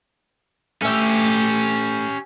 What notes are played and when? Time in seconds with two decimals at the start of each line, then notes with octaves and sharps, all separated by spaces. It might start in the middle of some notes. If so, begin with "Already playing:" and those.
0.82 A3 C#4 G4 E5